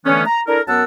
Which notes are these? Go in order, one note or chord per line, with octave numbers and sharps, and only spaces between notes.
D3 E3 A3 B3 C#4
A#5
D4 E4 A4 A#4
F#2 B3 A#4 F#5 A5 E6